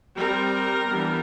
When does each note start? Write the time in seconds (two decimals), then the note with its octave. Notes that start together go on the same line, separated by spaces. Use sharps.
0.16 G3 C4 A#4
0.89 E3 G3 B3 D4